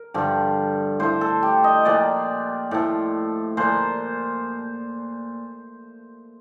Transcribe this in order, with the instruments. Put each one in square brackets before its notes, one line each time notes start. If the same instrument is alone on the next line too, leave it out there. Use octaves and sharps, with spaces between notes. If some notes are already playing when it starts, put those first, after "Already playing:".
Already playing: [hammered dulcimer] A#4
G2 D3 F3
A2 F3 C5
A4
G4
D#5
A#2 F3 D5
A2 F3
A#2 F3 C5